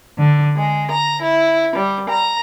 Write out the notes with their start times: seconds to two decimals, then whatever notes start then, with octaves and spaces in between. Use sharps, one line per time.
0.18 D3
0.55 G#3
0.91 A#5
1.21 E4
1.75 G3
2.08 A#5